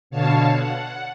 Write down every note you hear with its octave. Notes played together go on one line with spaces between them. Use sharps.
B2 D3 C#5 F5 A5
F#5